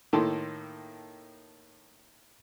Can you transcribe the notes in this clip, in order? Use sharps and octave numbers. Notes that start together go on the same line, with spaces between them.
A2 D#3 A#3 A4 A5 C6